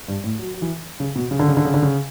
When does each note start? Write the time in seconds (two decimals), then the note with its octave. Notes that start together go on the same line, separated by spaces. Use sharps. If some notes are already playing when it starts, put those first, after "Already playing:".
0.08 G2
0.24 A2
0.39 F#3
0.54 F#3
0.62 E3
1.00 C#3
1.16 B2
1.31 C#3
1.39 D3
1.48 C#3
1.57 D3
1.65 C#3
1.74 D3
1.82 C#3